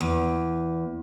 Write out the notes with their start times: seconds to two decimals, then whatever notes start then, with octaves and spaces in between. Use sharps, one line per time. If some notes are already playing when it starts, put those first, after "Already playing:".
0.01 E2